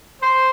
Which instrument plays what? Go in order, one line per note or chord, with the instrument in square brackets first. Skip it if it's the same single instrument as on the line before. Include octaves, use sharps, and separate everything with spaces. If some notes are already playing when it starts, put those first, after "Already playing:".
[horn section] C5